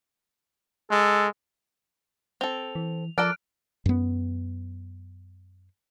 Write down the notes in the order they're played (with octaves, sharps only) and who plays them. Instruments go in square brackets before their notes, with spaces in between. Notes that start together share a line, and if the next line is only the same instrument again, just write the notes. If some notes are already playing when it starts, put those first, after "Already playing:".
[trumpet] G#3 [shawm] A4
[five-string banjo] C4 A4 [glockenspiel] F7
[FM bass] E3
[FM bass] F3 [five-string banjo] A4 A#4 D5 [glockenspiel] F6 F#6 D7
[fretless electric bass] F#2 B3